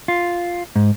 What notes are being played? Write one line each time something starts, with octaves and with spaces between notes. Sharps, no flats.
F4
G#2